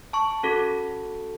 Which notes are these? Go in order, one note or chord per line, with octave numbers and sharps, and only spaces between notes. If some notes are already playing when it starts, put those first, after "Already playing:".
A5 C#6
C#4 F#4 A4